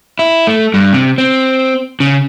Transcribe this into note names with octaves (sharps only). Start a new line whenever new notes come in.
E4
A3
G2
C3
C4
C#3